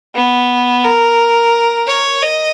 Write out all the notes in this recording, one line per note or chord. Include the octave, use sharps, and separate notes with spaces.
B3
A#4
C#5
D#5